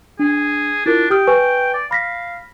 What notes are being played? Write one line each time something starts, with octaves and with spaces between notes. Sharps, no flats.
D4 G#4
D4 E4 F4 A#4
G4 G5 D#6 F6
B4 G#5 C#6
D5
F5 B5 A#6 B6